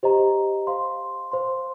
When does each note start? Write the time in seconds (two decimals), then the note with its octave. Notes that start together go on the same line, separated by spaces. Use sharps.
0.03 G4 C5 D#5 A#5
0.67 C5 F5 C6
1.32 C5 F5 C6